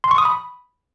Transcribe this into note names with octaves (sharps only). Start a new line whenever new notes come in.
C6
C#6
D#6
B5